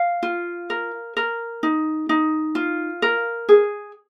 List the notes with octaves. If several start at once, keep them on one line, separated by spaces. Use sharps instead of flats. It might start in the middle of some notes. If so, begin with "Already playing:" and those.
Already playing: F5
F4
A#4
A#4
D#4
D#4
F4
A#4
G#4